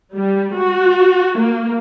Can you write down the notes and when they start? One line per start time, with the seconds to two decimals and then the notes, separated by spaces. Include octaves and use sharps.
0.16 G3
0.58 F#4
1.40 A#3